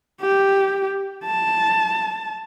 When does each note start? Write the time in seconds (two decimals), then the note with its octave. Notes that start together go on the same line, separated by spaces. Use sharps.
0.21 G4
1.24 A5